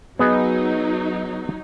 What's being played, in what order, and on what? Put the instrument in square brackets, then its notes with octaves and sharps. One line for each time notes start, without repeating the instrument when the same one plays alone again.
[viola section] F#3 D#4 [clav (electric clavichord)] B3 G#4 D#5